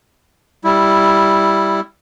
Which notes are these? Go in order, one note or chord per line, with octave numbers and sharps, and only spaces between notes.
G3 E4